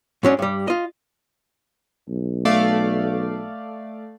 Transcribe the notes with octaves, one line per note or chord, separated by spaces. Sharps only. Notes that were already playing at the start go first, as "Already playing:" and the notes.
G#2 F#3 C#4 D4
G2 G3
F4 D#5
B1
A3 D5 F5